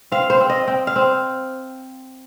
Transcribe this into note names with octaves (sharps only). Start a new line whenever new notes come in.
C4 F5
C5
C4
D#5
C4 G5
F5
C4